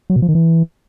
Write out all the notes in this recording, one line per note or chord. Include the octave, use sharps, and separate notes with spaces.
F#3
B2
F3
D#3
E3